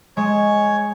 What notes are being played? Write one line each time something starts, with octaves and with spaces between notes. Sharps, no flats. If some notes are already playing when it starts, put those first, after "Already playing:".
G#3 C#5